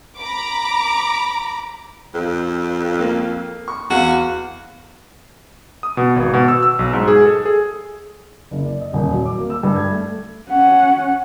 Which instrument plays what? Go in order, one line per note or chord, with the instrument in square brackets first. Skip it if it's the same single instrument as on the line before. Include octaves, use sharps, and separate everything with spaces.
[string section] A#5 B5 D6
[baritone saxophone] F2
[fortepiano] A#3
C#6
[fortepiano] E2 F5 [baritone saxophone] F#4
[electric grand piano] D#6
B2
G#1
B2
E6
E6
B1
G#2
G#4
A4
G#4
[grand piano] F#1
D5
D#5
D#1
F#3
D6
A#3
E6
G2
G#6
A3
[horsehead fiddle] C#4 F#5